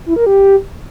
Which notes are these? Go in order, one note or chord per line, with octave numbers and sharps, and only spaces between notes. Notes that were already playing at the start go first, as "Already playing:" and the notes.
E4
A#4
G4